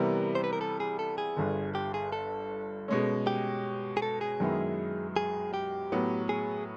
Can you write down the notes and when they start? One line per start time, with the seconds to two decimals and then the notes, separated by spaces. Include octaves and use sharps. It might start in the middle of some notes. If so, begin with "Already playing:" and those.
Already playing: C3 E3 G3 B3 A#4
0.35 C5
0.44 B4
0.53 A#4
0.61 A4
0.80 G#4
0.99 A4
1.18 G#4
1.36 G1 G2 D3
1.75 G4
1.94 G#4
2.12 A4
2.88 B2 G#3 C#4
3.27 G4
3.97 G#4
4.02 A4
4.21 G#4
4.40 F#2 D#3 G#3 B3 E4
5.16 G#4
5.54 G4
5.92 A2 F#3 B3
6.29 G#4